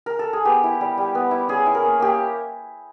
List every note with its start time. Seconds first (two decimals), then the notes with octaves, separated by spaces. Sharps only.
0.06 A#4
0.19 A4
0.33 G#4
0.45 B3 G4
0.64 E4
0.81 G3
0.98 G3
1.15 B3
1.31 E4
1.48 C#4 G#4
1.66 E4
1.75 A#4
1.82 A#3
2.00 A#3 G4